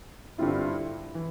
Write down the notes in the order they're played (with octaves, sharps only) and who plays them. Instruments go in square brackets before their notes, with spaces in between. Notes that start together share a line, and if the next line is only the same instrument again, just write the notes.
[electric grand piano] G2 D3 G3 C4 F4 [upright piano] E4
[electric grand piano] E3